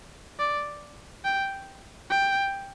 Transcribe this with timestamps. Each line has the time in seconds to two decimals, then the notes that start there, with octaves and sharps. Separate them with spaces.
0.39 D5
1.25 G5
2.11 G5